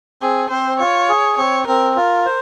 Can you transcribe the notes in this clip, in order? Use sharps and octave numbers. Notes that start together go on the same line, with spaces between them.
C4 G#4
C4 C5
F4 C#5
G#4
C4 C#5
C4 A#4
F4 A#4
C5